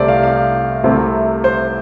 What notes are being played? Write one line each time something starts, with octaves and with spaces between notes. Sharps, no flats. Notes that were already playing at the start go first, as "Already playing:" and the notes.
Already playing: C2 C3 A3 C5 D5
F5
F5
C2 C3 A3 C4
C5